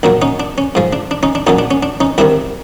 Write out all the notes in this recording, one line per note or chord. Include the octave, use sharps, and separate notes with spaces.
A#1 A#2 F#3 D4
C#4 D#4
D4
C#4
G#2 F3 G#3
D4
D4
C#4 D#4
D4
A#1 A#2 F#3 C#4 D#4
D4
C#4
D4
C#4 D#4
C2 C3 D#3 D4 E4